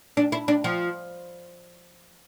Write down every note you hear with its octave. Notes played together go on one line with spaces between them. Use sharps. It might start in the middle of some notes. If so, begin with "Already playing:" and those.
D4
E4
D4
F3